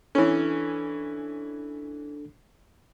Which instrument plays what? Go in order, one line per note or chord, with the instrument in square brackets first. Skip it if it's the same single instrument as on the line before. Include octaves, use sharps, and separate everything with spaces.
[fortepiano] E3 C#4 [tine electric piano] D4 A4